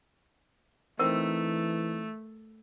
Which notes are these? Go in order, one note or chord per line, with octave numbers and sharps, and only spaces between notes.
E3 A3 C4 D#4 A#4